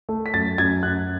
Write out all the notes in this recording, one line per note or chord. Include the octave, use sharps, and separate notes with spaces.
A3
B6
F#2 A6
F#2 G#6
F#2 F#6